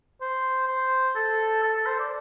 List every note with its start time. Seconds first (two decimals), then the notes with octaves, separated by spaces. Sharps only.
0.21 C5
0.67 C5
1.15 A4
1.63 A4
1.75 A4
1.86 C5
1.99 D5